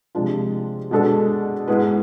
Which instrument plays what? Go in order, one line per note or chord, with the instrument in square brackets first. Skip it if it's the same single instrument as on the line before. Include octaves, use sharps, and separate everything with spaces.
[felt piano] C3 F3 G#3 D4 F4
B2 G#3 D4 A4
G#2 G#3 B3 E4 B4